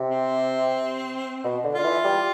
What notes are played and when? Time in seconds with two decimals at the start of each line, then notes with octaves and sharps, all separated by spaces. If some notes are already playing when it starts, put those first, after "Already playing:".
Already playing: C3
0.09 C4
1.44 B2
1.64 D3
1.74 D3 F4
1.84 E3
2.04 G3